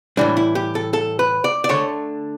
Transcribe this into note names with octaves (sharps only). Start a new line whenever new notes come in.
A2 E3 G3 D4
E4
G4
A4
A4
B4
D5
D5
D3 A3 C#5